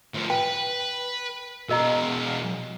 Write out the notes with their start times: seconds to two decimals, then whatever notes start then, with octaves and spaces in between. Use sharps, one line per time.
0.14 A2 F3
0.30 B4 G5
1.69 B2 G#3 A#4 D#5 A#5